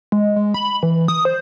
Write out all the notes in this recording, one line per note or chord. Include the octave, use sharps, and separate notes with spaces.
G#3
G#3
B5
E3
D#6
C5